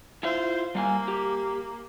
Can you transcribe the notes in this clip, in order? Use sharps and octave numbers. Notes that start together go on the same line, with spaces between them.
E4 F4 C5 E5
G3 A#3 F5 G#5
G4